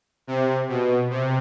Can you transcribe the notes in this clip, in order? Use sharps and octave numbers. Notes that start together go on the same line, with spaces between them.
C3
B2
C3